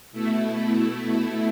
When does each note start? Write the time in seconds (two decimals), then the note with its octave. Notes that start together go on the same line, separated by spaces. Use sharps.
0.12 B2 A3 E4